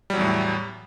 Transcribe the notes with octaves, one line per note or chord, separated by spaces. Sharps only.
E2 A2 F#3 G3